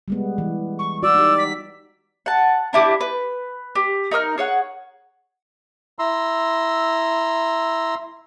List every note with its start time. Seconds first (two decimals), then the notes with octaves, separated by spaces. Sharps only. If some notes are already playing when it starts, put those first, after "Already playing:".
0.08 G3 G#3 B3
0.38 E3
0.79 C#6
1.03 F#4 D5 E6
1.15 D#4 G4
1.38 B6
2.26 F#5 A5
2.73 D4 E4 G4 D6
3.01 B4
3.75 G4
4.11 D#4 A#4 D#6 F6
4.38 G#4 C#5 F#5
5.99 E4 A#5 C6 E6